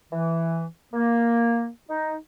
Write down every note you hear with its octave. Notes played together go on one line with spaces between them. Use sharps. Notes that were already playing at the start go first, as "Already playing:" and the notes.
E3
A#3
D#4